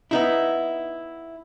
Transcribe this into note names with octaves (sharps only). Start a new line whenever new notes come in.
B3 D#4 E4